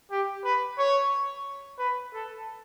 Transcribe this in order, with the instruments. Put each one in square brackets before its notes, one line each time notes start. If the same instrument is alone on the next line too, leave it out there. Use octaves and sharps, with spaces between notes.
[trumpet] G4
B4
C#5
B4
A4